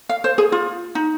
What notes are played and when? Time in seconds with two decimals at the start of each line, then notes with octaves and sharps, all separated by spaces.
0.09 F5
0.24 C5
0.38 G#4
0.52 F4
0.95 D#4